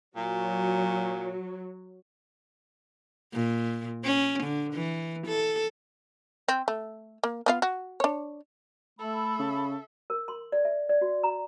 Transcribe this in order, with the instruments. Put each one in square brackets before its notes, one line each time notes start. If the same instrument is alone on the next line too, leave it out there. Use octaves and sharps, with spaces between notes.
[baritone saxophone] A#2 [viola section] F#3
[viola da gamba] A#2
C#4
D3
E3
A4
[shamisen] C4
A3
A#3
B3 F4 F5
F#4
D4 C#5
[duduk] A3 [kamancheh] A4 E5 [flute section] B5
[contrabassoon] C#3
[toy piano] A#4
C6
D5
E5
D5
F#4
A#5